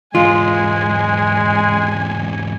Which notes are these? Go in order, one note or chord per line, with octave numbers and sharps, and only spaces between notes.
E2 G#2 G#3 F4 G#5